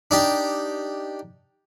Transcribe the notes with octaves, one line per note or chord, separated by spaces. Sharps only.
D4 D#4 G4